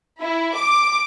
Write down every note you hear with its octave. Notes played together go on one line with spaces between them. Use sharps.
E4
D6